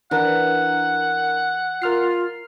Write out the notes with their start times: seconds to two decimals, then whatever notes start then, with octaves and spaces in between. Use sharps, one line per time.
0.11 E3 D4 A#4 F#5
1.82 F4 A#4 F6 C7